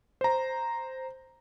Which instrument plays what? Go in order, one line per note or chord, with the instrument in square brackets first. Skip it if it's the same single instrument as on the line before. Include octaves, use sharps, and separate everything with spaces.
[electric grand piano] C5 A#5